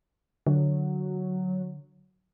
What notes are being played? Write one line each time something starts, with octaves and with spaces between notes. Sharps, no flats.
D3 F#3